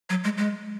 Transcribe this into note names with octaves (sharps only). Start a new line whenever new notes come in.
F#3
G#3
G#3